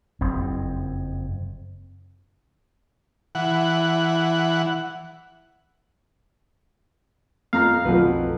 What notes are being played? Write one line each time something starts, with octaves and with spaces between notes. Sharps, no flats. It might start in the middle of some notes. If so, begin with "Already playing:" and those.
F#1 F2 C4
E3 F#5
F2 F5 A#5
B1 F2 F3 F#3 B4